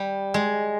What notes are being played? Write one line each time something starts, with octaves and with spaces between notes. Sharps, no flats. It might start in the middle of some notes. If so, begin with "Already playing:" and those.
Already playing: G3
G#3